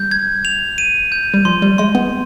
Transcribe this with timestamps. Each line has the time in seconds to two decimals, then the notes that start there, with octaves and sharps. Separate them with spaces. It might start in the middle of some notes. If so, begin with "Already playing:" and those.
Already playing: G3 G6
0.11 G#6
0.45 F7
0.78 D#7
1.12 G6
1.34 G3
1.45 F3 C6
1.62 G3
1.78 G#3 C6
1.95 B3